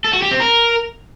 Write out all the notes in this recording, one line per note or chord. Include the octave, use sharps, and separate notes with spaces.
A4
F#4
G4
C4
A#4